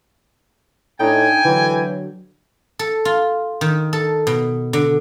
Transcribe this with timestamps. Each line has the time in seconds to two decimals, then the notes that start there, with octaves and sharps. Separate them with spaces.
1.00 A2 D4 D#4 G5 G#5
1.45 D3 E3 F#3
2.79 A4
3.05 F4
3.61 D#3
3.93 A4
4.27 B2
4.73 D3